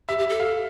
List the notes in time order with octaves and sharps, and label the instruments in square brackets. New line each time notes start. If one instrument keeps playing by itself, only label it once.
[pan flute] G4 [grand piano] E5
[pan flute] G4
A4
[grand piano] F5